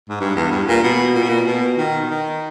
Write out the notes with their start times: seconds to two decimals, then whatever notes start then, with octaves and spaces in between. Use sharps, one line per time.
0.09 G#2
0.20 G2
0.36 E2
0.52 G2
0.68 A#2
0.83 B2
1.15 A#2
1.22 B2
1.29 A#2
1.47 B2
1.78 D#3
2.10 D#3